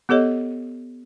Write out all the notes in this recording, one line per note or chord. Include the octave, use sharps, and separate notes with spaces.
B3 G4 A4 C#5 D#5